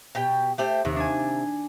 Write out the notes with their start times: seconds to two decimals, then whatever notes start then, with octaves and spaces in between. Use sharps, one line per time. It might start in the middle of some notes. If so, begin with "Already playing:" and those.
0.15 B2 G4 G5
0.58 A3 G4 C5
0.85 D#2 C3
0.96 D4 G#5